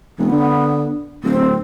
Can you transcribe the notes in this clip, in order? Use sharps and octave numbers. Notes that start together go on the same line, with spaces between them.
F1 B3
D3
D1 C4